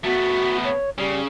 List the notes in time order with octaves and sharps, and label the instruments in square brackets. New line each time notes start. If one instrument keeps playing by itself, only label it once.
[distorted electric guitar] A3 B3 [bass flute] F#4
[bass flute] C#5
[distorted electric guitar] C#3 [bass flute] G3